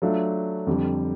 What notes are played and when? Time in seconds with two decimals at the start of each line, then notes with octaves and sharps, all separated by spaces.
0.02 F#3 A3 D4 F4
0.67 F2 D3 G3